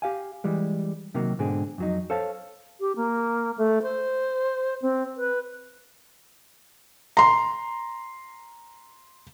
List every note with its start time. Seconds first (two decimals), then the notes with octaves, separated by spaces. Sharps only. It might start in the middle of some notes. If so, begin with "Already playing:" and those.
0.02 G4 F5 G#5
0.44 E3 G3 G#3
1.15 C3 D#3 F#3 A#3
1.39 G#2 B2 D3 C4 G#4
1.78 F2 F#3 D#4
2.10 A4 C5 C#5 F5 A5
2.80 G4
2.96 A#3
3.58 A3
3.83 C5
4.82 C4
5.17 B4
7.17 A#5 C6